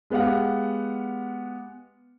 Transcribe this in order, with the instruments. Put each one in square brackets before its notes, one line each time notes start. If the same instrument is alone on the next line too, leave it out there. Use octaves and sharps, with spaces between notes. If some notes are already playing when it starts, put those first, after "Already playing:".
[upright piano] G#3 B3 G4 F5 F#5